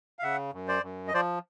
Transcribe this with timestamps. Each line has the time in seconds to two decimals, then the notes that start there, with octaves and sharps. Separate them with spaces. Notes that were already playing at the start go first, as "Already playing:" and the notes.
0.19 F5
0.23 C#3 E5 F#5
0.53 F#2
0.68 C5 D5
0.83 F#2
1.08 D#5
1.14 F3 C5 D5